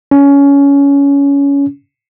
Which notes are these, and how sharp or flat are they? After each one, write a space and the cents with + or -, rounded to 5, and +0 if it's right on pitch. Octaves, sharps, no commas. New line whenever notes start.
C#4 +20